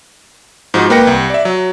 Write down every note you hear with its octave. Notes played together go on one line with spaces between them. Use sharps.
G#2 F3 D#4 F#4
A#3 B4 G5 A#6 C#7
C2
D5 E5
F#3